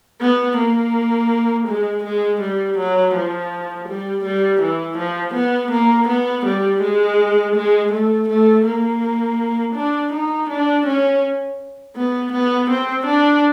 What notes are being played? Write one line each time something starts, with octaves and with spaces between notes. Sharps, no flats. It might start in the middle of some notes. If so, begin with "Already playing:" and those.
B3
A#3
G#3
G#3
G3
F#3
F3
G3
G3
E3
F3
B3
A#3
B3
G3
G#3
G#3
A3
A3
A#3
D4
D#4
D4
C#4
B3
B3
C4
D4